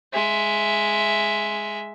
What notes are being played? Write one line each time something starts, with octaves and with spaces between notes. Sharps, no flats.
G#3 E5